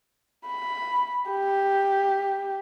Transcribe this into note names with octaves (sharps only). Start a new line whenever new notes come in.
B5
G4